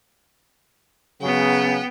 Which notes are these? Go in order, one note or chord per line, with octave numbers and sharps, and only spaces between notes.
C#3 F#3 B3 G5